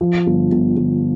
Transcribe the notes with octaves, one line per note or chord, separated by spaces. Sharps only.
F3
G1
G1
G1